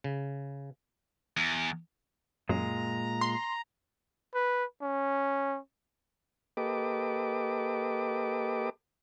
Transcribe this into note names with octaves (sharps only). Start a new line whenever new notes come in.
C#3
E2
F#2 A#2 G#3 A#5
C6
B4
C#4
A#3 G4 A4 B4 D#5 D6